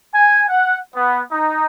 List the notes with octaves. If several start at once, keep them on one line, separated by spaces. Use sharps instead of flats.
G#5
F#5
B3
D#4